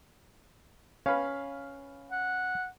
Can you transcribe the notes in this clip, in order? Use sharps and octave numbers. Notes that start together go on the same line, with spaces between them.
C#4 B4 F5
F#5